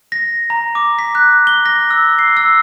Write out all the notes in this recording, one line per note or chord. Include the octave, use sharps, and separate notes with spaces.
A#6
A#5
D6
B6
F#6
G7
A#6
E6
C7
E6